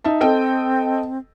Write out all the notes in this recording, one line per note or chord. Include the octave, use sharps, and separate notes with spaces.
D#4 E5 A5
C4 A4 D#5 G5